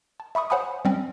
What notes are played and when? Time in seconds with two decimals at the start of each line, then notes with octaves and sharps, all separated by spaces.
0.20 A5
0.35 E5 B5 C#6 D#6
0.50 C5 C#5 F#5 G#5 B5 D#6
0.85 G3 C4 C#4